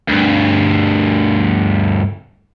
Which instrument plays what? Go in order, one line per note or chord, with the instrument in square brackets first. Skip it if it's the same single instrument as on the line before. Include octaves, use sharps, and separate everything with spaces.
[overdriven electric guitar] D2 G2